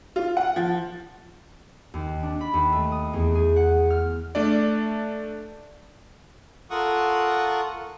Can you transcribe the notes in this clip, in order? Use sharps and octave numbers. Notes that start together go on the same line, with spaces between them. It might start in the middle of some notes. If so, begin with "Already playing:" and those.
F4
F#5
F3
D#2
D4
B5
D#2
A3
D#6
E2
G#4
F#5
F6
A3 D4 D5
F4 A4 A#4 F#5 C#6 D#6